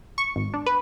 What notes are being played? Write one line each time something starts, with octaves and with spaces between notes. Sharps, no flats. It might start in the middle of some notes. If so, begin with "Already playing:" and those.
C#6
G#1
D4
B4